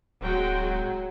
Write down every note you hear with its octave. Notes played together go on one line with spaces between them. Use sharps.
D1 F#3 G#3 F#4 G5